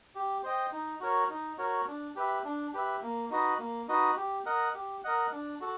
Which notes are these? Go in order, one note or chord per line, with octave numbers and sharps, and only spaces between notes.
G4
C5 D#5 G5
D#4
F#4 A#4 C#5
D#4
F#4 A#4 C#5
D4
G4 B4 E5
D4
G4 B4 E5
A#3
D#4 F#4 B4 D#5
A#3
D#4 F#4 B4 D#5
G4
A#4 D#5 F#5
G4
A#4 D#5 F#5
D4
F#4 A4